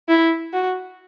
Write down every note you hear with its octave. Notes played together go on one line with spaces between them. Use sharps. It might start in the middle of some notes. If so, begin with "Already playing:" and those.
E4
F#4